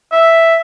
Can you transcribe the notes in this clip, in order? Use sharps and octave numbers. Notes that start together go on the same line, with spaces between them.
E5